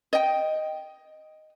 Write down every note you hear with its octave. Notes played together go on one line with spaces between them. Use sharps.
D#5 G5